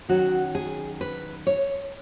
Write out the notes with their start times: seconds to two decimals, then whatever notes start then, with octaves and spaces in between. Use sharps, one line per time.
0.09 D#3 F#3 C#4 F#4
0.55 G#4
1.01 B4
1.47 C#5